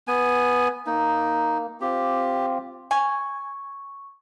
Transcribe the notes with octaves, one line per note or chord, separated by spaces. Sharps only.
B3 G#5
A#3 D#4
C4 F4 G4
G#5 C#6